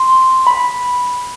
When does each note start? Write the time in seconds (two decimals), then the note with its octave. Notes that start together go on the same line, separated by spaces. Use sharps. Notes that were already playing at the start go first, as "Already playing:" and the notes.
Already playing: C6
0.47 B5